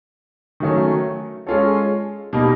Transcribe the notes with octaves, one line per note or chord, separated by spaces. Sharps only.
D#3 F#3 A3 C#4
G#3 C#4 F4 A4 C#5
B2 G3 A#3 D#4